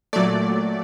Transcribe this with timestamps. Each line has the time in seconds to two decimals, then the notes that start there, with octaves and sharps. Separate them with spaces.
0.13 A#2 F#3 A3 D5